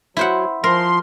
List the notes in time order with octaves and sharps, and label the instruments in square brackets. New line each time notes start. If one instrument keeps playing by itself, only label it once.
[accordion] F#3 [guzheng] E4 C5 F#5
[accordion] F3 C6 [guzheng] A#4